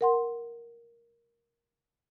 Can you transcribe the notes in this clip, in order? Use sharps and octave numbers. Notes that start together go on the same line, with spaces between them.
A#4 F#5 C6